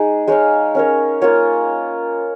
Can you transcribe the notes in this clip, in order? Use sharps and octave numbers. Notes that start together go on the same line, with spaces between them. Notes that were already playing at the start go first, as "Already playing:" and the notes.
Already playing: G#3 D#4 G#4
G#3 D#4 C#5 F5
C#4 A#4 C#5
A#3 F4 C#5